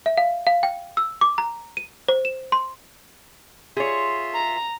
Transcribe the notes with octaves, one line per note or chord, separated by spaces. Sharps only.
E5
F5
F5
G5
E6
D6
A#5
D#7
C5
E7
C6
F4 G#4 C#5 E5 C6
A#5